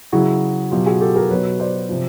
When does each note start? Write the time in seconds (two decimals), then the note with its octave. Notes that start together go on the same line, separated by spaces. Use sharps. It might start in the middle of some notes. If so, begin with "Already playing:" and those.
0.12 C#3 F#3 E4 F#4
0.71 B2 F#3 F4 G4
0.86 F#4 G#4
1.01 G4 A4
1.16 G#4 A#4
1.30 B2 F#3 B4 C#5
1.60 C5 D5
1.89 C3 F3